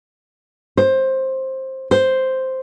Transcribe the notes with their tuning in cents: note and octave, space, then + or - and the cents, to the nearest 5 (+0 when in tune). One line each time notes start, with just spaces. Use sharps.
C5 +15
C5 +0